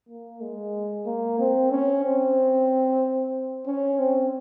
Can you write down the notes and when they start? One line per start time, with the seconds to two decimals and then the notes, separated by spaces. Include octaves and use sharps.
0.09 A#3
0.41 G#3
1.06 A#3
1.39 C4
1.71 C#4
2.04 C4
3.66 C#4
3.99 C4